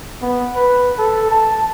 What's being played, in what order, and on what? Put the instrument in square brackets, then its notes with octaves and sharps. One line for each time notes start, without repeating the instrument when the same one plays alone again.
[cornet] B3
B4
A4
A5